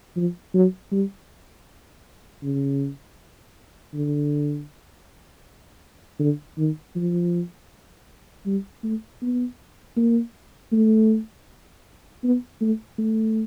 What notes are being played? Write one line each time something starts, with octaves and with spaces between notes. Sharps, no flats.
F3
F#3
G3
C#3
D3
D3
D#3
F3
G3
A3
B3
A#3
A3
B3
A3
A3